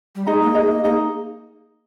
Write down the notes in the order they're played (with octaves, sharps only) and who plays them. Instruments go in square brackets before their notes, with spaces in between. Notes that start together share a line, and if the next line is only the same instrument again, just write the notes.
[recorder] G3
[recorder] G#3 [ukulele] D#4 G#4 D#5 A#5
[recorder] A#3
[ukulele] D#4 G#4 D#5 A#5
[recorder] A#3 [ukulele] D#4 G#4 D#5 A#5